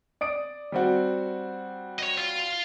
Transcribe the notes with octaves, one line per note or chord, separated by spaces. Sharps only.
D5 D#6 D7
G3 C4 F#4
C#5 D#5
F4